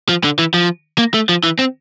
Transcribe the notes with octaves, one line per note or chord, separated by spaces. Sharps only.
F3
D3
E3
F3
A#3
A3
F3
E3
C4